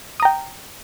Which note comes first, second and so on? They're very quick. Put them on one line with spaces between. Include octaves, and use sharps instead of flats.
D#6 A#5 G5